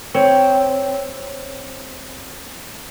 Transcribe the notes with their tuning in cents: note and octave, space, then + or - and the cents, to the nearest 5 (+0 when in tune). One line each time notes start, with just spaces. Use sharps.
C4 +0 C#5 +5